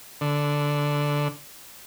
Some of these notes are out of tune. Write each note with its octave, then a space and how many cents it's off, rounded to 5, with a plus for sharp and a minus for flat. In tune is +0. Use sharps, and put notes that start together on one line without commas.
D3 -10